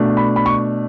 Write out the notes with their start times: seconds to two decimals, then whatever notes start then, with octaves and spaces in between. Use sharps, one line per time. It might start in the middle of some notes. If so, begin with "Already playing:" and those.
Already playing: B2 A3 D4
0.17 B5
0.36 B5
0.46 C#6